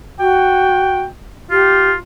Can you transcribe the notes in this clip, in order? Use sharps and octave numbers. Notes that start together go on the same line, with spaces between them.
F#4 G5
F4 G4